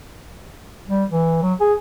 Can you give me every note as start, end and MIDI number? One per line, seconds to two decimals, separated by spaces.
0.88 1.04 55
1.11 1.38 52
1.43 1.53 54
1.60 1.73 68